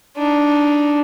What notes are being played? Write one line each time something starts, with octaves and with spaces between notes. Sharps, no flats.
D4 D#4